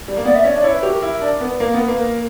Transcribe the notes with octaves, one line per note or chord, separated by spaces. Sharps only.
G3
A#3
B3 D5
E5
C#4 D5
D4 D5
E4 C#5
B4
F#4 G4
A#4
E4
D4
B3 B4
A#3 A#4
B3
B4
A#3
A#4